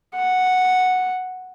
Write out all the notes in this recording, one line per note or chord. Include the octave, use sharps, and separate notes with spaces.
F#5